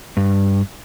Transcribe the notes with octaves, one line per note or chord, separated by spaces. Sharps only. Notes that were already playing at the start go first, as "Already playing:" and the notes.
G2